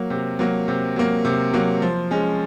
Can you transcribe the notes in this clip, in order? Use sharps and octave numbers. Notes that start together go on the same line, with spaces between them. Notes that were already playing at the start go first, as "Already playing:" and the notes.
Already playing: F#3 A#3
C3
F#3 A#3
C3
F#3 A#3
C3
F#3 A#3
F3
G#3 C#4